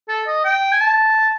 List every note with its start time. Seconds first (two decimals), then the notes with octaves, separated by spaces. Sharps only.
0.09 A4
0.27 D#5
0.45 G5
0.72 G#5
0.81 A5